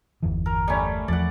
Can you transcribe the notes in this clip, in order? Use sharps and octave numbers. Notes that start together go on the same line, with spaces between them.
G1 E2 E3
A#4
G3 A3 C#4
E2 F3 D5 F#5